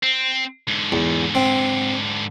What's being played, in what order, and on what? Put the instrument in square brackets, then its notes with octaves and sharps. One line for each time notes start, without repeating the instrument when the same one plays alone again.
[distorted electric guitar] C4
G#2 D3
[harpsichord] E2
C4